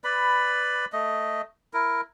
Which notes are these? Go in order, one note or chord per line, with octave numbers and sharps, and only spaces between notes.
B4 D5 B5
A3 D#5
E4 A#4